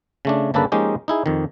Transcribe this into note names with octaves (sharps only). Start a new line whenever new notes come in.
C#3 A3 D4
G1 C#3 A#3 D4 A4 B4
F3 G#3 A#3 C#4 D#4 G4
D#4 E4 G#4
F2 D#3